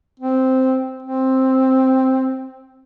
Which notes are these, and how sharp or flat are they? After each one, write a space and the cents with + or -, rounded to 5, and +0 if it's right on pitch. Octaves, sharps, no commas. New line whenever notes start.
C4 -5
C4 +5